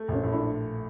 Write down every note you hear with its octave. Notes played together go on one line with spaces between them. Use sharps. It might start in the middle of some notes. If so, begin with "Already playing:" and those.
Already playing: A3
A#1 C#4
A2
D4 E4